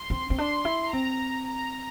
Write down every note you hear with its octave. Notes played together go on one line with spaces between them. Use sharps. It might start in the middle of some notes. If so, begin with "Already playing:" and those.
Already playing: C6
C4
C4
D4 C6
E4
C4 A#5
A#5